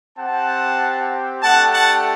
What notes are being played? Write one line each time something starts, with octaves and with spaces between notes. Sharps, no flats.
C4 G4 F#5 A5
A3 D4 G4 F#5 A5
F#5 A5